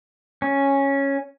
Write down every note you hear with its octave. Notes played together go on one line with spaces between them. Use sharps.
C#4